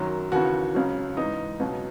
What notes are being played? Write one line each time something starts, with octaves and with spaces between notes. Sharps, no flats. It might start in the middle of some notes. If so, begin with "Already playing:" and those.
Already playing: F#2 D#3 F#3
D#2 C#3 E3 F#4
C#2 C#3 F#3
G#2 E3 D#4
C#2 B2 F#3